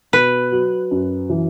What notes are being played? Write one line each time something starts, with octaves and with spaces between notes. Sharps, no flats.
B2 B4
F#3
F#2
E3